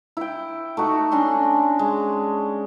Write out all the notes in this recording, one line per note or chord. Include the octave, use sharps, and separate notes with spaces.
E4 G5
A3 D#4 F#4
C#4 D4 G#5 C6
G#3